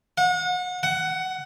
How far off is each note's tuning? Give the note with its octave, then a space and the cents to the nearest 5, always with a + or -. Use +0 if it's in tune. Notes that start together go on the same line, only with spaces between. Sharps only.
F#5 -35
F#5 +15